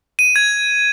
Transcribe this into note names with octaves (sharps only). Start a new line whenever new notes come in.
D#7
G#6